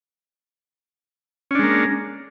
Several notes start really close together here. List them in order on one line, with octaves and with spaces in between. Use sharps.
C#4 D4 G#3 A#3